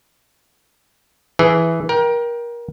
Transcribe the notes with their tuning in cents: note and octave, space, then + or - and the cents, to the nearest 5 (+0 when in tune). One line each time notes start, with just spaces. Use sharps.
E3 +0 G#4 +5
A#4 +25 G5 +0